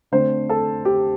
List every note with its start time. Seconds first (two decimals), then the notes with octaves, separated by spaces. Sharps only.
0.12 D3 A3 C4 C5
0.49 A4
0.85 G4